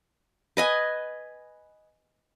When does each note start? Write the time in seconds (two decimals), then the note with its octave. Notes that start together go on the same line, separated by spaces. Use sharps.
0.57 B4 D#5 G#5